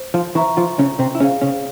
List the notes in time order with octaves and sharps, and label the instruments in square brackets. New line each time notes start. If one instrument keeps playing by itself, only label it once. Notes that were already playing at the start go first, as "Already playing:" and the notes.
Already playing: [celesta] C5
[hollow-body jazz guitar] F3 F4
[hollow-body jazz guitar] E3 E4 [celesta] C5 E5 A#5 C#6
[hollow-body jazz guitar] F3 F4
C#3 C#4
C3 C4
E4
[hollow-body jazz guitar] C#3 C#4 [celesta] G#4 C5 F5
[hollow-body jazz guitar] C#3 C#4